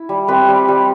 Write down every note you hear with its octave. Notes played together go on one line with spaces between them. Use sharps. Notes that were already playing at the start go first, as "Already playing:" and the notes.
Already playing: E4
G3
C4 G4 B4
G3
G3